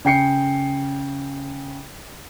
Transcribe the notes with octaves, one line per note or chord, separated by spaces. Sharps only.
C#3 G5 C7 C#7